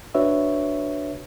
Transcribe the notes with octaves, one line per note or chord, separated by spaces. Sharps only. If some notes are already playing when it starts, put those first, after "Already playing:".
D4 F#4 B4 C#5 E5